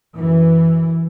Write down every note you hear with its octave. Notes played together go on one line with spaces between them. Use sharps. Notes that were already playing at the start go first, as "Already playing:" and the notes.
F#2 E3